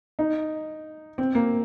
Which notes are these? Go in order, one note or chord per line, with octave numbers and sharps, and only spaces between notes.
D#4
C4
A#3